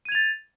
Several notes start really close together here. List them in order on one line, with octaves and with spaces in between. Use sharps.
D#7 G#6 F7 A6